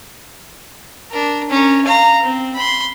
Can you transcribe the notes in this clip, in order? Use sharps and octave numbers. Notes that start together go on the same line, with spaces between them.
D4 A#4
C#4 A#4
F5 A#5
C4
B5 C6